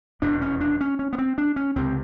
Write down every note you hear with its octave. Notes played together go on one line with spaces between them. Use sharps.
F1 E2 B2 D4
C#4
D4
C#4
C#4
B3
C4
D4
C#4
C#2 C3 C4